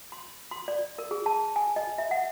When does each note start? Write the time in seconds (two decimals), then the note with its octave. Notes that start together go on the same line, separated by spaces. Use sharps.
0.12 C6
0.51 C6
0.68 D5
0.98 A#4
1.11 G#4
1.26 A5
1.56 G#5
1.76 D#5
1.98 E5
2.11 F#5